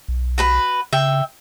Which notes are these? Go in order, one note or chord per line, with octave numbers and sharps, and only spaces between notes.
B1
F#4 B4 B5
C#3 E5 G5